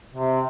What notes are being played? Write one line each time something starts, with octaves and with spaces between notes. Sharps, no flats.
C3